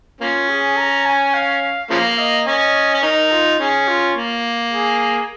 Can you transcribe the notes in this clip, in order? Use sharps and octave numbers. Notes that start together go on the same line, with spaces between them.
A#3 C#4 F4
G#4
A#5
G#5
F5
C#3 F3 A#3 F5
D#5
C#4 D#5
C#4
D#4 A#4
F4
C#4 G#4
F4
A#3
G#4